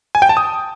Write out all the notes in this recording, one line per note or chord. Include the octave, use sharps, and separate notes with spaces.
G#5
G5
A5
D#6